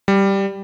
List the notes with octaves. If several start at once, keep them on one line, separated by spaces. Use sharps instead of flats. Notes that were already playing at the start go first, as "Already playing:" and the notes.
G3